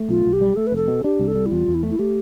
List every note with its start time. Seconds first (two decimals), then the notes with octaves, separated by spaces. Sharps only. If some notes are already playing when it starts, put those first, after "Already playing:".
Already playing: A3
0.09 B1 F4
0.26 B1
0.33 G4
0.41 G3
0.56 A3 A4
0.67 B4
0.72 F1 A4
0.88 B2
1.04 D4 G4
1.19 C2
1.28 A4
1.35 G3
1.46 E4
1.51 E2 F4
1.68 E2
1.75 E4
1.83 A3
1.91 E4
1.99 A3 G4